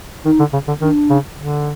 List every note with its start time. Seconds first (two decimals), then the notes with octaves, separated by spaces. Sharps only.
0.25 D#3 D#4
0.39 D3
0.53 C#3
0.68 D3
0.81 D#3 D4
1.10 C#3
1.38 D3